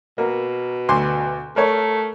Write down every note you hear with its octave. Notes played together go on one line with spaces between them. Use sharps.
B2 A#3
D2 C6 D6
A3 A#4 C#5